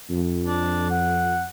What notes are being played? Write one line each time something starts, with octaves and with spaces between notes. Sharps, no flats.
F2
D4
F#5